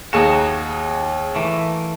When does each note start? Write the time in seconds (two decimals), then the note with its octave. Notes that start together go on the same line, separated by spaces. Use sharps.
0.13 D#2 D#4 F#4 G#4 E7
1.35 E3 A3 A#3